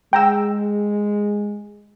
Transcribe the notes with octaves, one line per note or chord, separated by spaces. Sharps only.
G#3 G5 A#5 E6